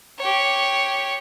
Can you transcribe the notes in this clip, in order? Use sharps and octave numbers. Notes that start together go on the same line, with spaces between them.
G4 C#5